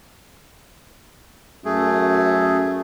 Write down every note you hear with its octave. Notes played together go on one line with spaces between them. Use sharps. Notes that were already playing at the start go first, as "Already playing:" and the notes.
F#2 A3 G#4